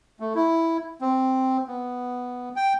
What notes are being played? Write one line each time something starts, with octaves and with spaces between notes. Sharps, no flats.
A3
E4
C4
B3
G5